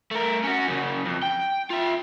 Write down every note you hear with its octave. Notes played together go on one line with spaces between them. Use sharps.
A3 A#4
C#4 F#4
F#2 C#3
F2
G5
F4 E5